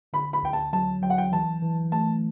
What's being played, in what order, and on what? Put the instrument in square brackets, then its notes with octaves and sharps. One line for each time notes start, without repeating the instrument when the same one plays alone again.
[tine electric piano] D3 [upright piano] B5
[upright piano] B5
[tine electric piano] D2 [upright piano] G5
[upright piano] A5
[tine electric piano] F#3 [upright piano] A5
[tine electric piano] F#3 [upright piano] G5
[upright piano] F#5
G5
[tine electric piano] E3 [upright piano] A5
[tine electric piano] E3
[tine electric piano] A3 [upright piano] A5